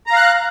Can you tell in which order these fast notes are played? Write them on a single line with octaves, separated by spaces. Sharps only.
A#5 F5 F#6